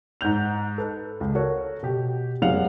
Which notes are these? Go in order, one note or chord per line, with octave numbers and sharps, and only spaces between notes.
G#2 F#5 G6 F7
A4 B4
C#2
F#4 A4 A#4 C#5
B2 G4
F1 F#2 G#3 F5 F#5 F7